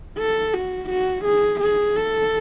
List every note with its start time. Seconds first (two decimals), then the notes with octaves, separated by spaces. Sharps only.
0.19 A4
0.54 F#4
0.89 F#4
1.24 G#4
1.60 G#4
1.96 A4